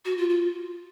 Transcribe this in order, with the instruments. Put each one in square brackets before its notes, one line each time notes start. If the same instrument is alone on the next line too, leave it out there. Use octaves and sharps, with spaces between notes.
[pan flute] F#4
F4
F4